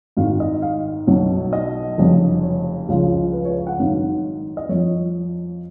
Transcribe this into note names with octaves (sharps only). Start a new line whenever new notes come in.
G#1 G#2 D#3 F5
D#5
F5
B1 B2 F#3
D#5
F1 F2 C#3 F#3
C#5
C#2 C#3 F3
B4
C#5
F#5
G#1 G#2 D#3 F#3 F5
D#5
F2 F3 C#5